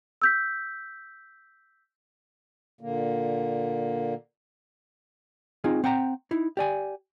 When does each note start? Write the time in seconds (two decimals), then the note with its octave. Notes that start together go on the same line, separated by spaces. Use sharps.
0.22 E6 G6 B6
2.81 A#2 D3 A#3
5.64 C4 D#4 F4 G#4
5.84 C4 F#5 G5 A5 A#5
6.31 D#4 E4
6.57 G4 D5 G#5